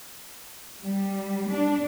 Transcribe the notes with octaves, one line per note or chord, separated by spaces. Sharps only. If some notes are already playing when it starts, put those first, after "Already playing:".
G3
D4